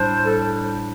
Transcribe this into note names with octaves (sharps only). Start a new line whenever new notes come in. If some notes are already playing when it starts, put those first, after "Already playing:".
Already playing: A2 G3 D4 C5
A4